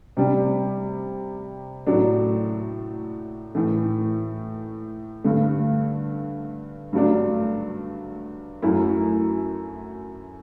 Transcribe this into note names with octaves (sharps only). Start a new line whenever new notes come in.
C3 G3 D4
A2 F#3 A3 D4
A2 E3 A3
G2 D3 A3
G2 F#3 A3 D4
F#2 F#3 A3 E4